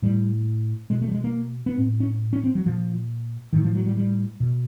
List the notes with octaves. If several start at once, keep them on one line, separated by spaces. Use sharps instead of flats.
A2 G3
B2 G#3
A3
G3
G#3
A#3
B3
A2 C4
C#4
C#4
C4
F#3
A#2 F3
A2 D#3
F3
F#3
G3
G3
B2